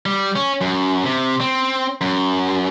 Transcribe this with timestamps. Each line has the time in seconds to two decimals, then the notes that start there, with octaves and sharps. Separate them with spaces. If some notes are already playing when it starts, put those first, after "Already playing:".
0.06 G3
0.36 C#4
0.61 F#2
1.04 C3
1.41 C4
2.01 F#2